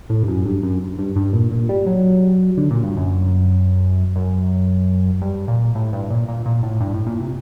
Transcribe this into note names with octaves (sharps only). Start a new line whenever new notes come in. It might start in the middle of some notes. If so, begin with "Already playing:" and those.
A2
G2
F#2
G2
F#2
G2
G2
A#2
A#2
G3
F#3
D3
A#2
G2
F#2
F#2
G2
A#2
A2
G2
A#2
A#2
A#2
A2
G2
A2
A#2
C3